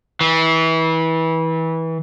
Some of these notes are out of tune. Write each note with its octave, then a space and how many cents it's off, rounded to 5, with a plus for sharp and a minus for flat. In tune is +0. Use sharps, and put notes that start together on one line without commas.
E3 -25